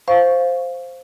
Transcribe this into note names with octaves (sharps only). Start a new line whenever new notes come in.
C5 F5 C#6